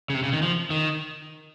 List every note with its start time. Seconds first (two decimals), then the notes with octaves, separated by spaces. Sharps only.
0.10 C#3
0.14 C3
0.23 C#3
0.33 D#3
0.42 F3
0.70 D#3